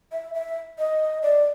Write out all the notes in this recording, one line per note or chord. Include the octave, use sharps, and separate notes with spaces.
E5
E5
D#5
D5